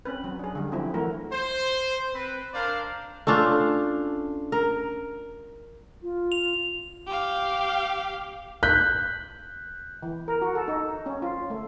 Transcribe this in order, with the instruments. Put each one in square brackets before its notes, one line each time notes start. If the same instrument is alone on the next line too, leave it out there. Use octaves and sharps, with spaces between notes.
[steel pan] C4 C#4 B4
F#3
D4 G#4
D3 G3
F3 F#3 C4 E4 F4
E3 A3 F#4 A#4
[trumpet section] C5
C4 B4
D4 A#4 C5 D5 F5
[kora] A3 C#4 D4 F4
A#4
[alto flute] F4
[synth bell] F7
[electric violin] G4 F5
[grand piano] F#6 G6 B6
[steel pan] E3
A#4
F#4
A4
D#4
C#4
F4
A3